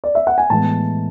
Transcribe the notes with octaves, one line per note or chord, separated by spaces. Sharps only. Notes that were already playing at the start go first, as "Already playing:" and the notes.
D5
E5
F#5
G#5
A2 E3 G#3 B3 A5